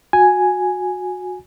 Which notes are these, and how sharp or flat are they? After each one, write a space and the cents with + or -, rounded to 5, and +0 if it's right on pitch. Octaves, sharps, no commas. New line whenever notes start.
F#4 -20 G#5 +0